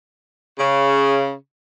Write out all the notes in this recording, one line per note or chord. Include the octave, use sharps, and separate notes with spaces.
C#3